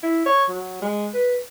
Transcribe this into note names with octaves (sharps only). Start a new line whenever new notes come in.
E4
C#5
F#3
G#3
B4